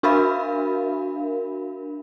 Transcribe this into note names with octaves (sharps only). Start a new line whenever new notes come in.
D4 F#4 A#4 E5 F5 B5